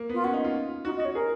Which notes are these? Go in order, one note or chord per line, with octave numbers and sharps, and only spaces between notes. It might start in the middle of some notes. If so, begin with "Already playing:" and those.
Already playing: A#3
B3 F4
C#4 F#4
D#4
F4
D#4 F#4
D#5
F#4
C#5
G#4 A#4